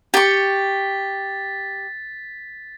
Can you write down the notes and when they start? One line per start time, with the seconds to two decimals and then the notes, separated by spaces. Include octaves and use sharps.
0.14 G4 C#6 A6 B6